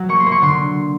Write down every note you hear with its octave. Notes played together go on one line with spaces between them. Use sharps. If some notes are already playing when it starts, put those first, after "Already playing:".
Already playing: F#3
A#3 C#6
C6
A#3
C#6
D3 C6